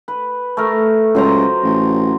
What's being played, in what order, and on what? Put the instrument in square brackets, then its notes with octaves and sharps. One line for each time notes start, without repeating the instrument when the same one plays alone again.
[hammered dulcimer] B4
A3 A#4
[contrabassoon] C#2 [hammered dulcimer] F#3 C5 A#5
[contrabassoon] A1